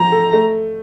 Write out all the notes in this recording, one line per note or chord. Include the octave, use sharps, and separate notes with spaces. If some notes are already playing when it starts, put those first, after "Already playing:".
Already playing: F3 C4 A#5
A4
A3